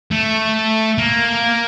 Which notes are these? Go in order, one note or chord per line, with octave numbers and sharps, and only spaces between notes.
A3
A#3